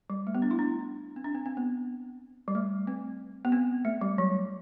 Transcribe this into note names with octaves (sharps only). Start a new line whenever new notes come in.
G3
A3
B3
D4
E4
D4
C4
D4
C4
C4
B3
G3
A3
C4
B3
C4
A3
G3
F#3